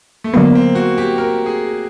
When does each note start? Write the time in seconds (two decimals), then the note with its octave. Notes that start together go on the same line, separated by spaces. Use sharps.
0.24 A3
0.34 D3 F#3 A#3 B3
0.55 C4
0.75 F#4
0.98 G4
1.18 A#4
1.46 G#4